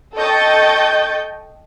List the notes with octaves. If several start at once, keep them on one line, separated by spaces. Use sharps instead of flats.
A4 D#5 G5 C#6 G6 A6